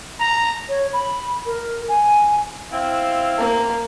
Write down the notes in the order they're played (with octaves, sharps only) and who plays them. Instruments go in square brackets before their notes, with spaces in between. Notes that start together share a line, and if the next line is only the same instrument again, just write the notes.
[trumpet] A#5
[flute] C#5
B5
A#4
G#5
[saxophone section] C4 E4 C5 [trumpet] F5
[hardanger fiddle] A#3